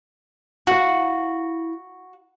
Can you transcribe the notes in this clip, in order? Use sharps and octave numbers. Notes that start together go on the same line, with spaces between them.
E4 F#4 F5